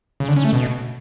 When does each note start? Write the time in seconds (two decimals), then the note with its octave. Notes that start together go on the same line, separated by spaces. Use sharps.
0.20 C#3
0.28 D3
0.36 C#4
0.45 A3
0.53 B2